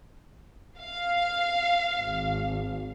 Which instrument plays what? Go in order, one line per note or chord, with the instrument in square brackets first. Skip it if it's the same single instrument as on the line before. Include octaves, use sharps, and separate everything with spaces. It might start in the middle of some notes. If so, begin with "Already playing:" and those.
[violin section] F5
[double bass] G#1